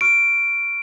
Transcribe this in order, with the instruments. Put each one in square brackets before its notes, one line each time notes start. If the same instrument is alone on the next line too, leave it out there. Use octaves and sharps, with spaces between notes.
[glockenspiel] C#6 F6 D7